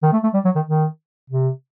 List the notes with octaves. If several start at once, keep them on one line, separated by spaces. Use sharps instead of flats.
D#3
A3
A3
G3
F#3
D#3
D#3
C3